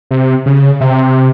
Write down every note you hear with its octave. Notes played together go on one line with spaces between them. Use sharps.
C3
C#3
C3